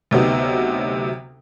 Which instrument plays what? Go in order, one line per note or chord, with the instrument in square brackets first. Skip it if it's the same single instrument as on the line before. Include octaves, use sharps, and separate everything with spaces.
[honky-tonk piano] D2 C3 F#3 B3 D#4